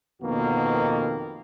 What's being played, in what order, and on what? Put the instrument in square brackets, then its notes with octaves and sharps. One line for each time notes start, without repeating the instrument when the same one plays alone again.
[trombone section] F2 B2 D#3 A#3 B3 F#4